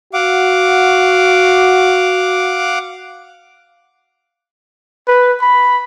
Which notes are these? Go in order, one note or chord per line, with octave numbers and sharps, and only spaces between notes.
F#4 F5 F#5 D6
B4
B5